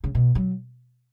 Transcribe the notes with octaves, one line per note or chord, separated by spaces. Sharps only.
C#3
B2
F#3